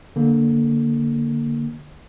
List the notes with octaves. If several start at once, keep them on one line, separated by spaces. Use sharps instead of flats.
D3 A#3